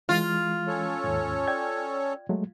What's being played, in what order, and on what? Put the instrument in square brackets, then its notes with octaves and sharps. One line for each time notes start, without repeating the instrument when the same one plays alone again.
[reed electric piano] E3 G#3 [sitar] F4
[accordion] C#4 A4 C#5
[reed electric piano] D#2 G#2
D5 G5 G#6
F#3 G#3 A3